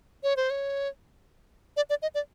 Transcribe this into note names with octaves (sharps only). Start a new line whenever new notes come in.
C#5
C5
C#5
D5
D5
D#5
D5